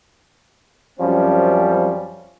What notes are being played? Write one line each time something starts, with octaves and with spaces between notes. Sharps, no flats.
F#2 F3 G3 C4 C#4